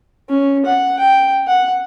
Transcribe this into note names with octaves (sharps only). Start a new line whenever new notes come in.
C#4
F#5
G5
F#5